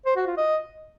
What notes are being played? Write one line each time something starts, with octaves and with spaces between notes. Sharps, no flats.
C5
F#4
F4
D#5